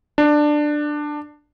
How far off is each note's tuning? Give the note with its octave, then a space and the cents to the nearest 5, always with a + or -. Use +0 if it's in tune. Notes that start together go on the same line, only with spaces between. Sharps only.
D4 +15